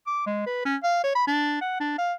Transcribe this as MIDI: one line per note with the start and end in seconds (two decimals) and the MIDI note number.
0.07 0.22 86
0.26 0.42 56
0.46 0.64 71
0.66 0.76 61
0.83 1.02 77
1.04 1.13 73
1.15 1.26 83
1.27 1.60 62
1.61 1.75 78
1.80 1.97 62
1.98 2.14 77